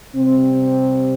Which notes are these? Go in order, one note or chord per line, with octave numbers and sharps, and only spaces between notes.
C3 G3 C4